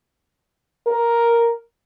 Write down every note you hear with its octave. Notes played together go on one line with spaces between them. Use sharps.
A#4